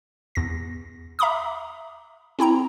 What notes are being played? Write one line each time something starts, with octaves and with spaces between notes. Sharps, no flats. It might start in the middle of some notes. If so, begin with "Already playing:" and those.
E2 A#6
E5 A#5 B5 D6 D#6
C4 E4 G5 A#5